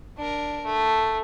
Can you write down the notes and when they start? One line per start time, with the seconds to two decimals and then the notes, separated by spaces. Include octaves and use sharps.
0.18 D4 A#4
0.66 A3